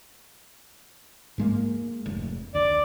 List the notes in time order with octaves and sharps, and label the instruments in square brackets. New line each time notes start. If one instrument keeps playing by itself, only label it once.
[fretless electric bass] G#2 G#3 A#3
F1
[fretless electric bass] D2 [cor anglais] D5